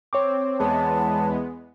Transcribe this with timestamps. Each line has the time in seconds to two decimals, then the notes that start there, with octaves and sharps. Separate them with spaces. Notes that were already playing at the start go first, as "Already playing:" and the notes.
0.13 C4 C#5 D6
0.59 E2 G#3 B3 A5